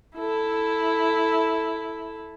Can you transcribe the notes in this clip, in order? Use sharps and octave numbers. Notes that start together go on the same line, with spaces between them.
E4 A4